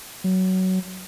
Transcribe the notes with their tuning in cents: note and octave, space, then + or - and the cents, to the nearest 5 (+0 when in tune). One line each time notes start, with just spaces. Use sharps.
F#3 +15